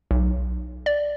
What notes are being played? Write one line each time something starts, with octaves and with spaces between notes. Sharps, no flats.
B1
D5